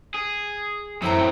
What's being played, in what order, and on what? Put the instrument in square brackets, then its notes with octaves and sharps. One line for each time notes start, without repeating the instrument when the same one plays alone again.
[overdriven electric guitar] G#4
[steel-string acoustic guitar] F#2 E4 A#5 [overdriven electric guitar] A2 C4